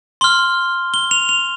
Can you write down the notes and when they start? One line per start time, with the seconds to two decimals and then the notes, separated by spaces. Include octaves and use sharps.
0.21 C6 F6 G7
0.94 G7
1.11 F7
1.29 F7